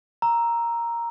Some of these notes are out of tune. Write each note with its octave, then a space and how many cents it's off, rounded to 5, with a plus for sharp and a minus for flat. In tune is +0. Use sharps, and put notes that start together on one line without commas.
A#5 +0 E6 +5